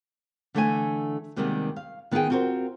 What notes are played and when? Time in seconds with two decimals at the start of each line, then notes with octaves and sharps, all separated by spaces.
0.55 D3 E3 A3 D4 G5 G#5
1.36 D#2 C3 D#3 G3 G#3 B3
1.76 F5
2.11 D#3 B3 D#4 F4 G#4 G5
2.30 C4 F4 F#4 A#4 C5